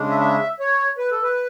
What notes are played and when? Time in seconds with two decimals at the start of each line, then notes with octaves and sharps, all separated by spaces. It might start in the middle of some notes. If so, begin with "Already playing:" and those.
Already playing: C#3 G#3 D4
0.10 E5
0.20 E5
0.60 C#5
0.98 B4
1.11 A4
1.23 B4